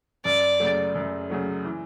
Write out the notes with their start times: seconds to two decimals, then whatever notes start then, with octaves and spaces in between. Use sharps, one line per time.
0.25 F#2 D5
0.60 C#3 F#3 A3
0.95 F#2
1.30 C#3 F#3 A3
1.65 E3